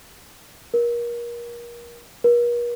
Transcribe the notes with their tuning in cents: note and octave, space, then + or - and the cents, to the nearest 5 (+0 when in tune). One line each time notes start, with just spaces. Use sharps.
A#4 +30
A#4 +45